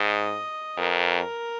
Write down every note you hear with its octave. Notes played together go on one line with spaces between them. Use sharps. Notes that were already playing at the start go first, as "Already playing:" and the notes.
Already playing: G#2 D#5
F2 A#4